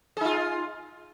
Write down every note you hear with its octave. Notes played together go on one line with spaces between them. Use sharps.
D#4 F4 G#4